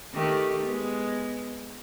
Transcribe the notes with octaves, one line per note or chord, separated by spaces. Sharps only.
D#3 A3 G4
G#3 B3